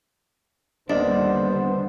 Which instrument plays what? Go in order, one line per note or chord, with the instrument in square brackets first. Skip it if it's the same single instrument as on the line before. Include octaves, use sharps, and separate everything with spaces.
[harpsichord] D#2 [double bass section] D3 G3 B3 [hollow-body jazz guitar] D4 [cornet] C5